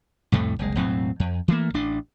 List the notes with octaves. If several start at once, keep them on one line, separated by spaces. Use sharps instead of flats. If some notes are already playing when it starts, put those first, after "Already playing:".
C2 F2 A2 A3
F#1 C2 G#3
E1 A2 F#3 C4
F2
E3 F3 A3 A#3
A1 D4